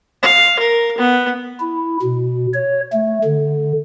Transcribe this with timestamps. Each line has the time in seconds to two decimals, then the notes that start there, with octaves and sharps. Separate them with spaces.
0.22 F5
0.59 A#4
0.97 B3
1.60 E4
2.02 B2
2.54 C#5
2.93 A3
3.24 D3